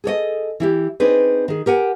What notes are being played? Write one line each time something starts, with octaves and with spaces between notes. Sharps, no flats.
G#4 A4 C#5 D#5
E3 E4 G4
C4 D4 D#4 G#4 B4
D#3 G#4
G4 A#4 F#5 G#5